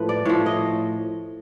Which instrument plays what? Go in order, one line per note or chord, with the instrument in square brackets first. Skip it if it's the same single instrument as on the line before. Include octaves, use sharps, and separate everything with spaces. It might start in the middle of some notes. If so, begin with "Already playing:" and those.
Already playing: [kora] A2 F3 B4
D5
A2 F3 C#5
D#5